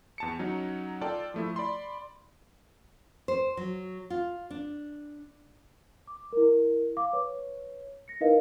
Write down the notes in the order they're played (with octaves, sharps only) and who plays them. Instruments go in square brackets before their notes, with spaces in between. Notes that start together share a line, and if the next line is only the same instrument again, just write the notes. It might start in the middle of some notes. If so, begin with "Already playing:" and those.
[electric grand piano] E2 A5 C#7
F#3 C#4 D#4
F4 A4 D5 G5 A5
F3 A3 E4
D5 B5 C6
[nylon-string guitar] C5
F#3
F4
D4
[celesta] D6
E4 A#4
F5 D6
B4 C#5
A#6 C#7
D#4 E4 A#4 B4 D#5 F5